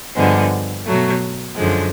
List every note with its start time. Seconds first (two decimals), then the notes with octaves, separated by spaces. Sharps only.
0.15 G2 D3 F3 G#3 B3
0.86 B2 F#3 A3
1.56 F#2 D3 F3 G#3